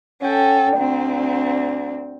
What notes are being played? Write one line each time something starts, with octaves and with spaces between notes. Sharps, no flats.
C#4 A4 F#5 G5
D2 C4